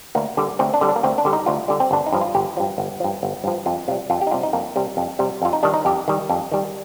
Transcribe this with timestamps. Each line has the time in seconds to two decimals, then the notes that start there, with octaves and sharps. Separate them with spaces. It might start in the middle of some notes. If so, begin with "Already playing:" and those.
0.15 D2 A#3
0.37 D3 G3
0.59 D2 C4
0.74 D4
0.81 D3 G3
0.88 D4
0.96 A#3
1.03 D2 C4
1.18 D4
1.25 D3 G3
1.33 D#4
1.46 D2 F4
1.68 D3 G3
1.80 C4
1.91 G1 D4
2.06 D#4
2.12 G2 F3
2.21 F4
2.35 G1 G4
2.57 G2 F3
2.78 G1
3.00 G2 F3
3.23 G1
3.44 G2 F3
3.66 F2 F4
3.88 C3 G3 F4
4.10 F2 F4
4.21 G4
4.27 D#4
4.31 C3 G3 F4
4.43 D#4
4.53 F2 A#3
4.76 C3 G3
4.97 F2
5.19 C3 G3
5.42 F2 F4
5.53 D#4
5.63 D#3 G3 D4
5.74 D#4
5.85 F2 G4
6.08 D#3 G3
6.29 F2
6.52 D#3 G3